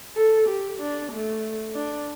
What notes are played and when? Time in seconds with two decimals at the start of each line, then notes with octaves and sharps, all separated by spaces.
0.16 A4
0.48 G4
0.80 D4
1.12 A3
1.75 D4